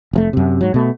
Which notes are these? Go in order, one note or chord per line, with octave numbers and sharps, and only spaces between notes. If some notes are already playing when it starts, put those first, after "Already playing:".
F1 C3 A3
F#2 C3
G#2 F#3
B2 A3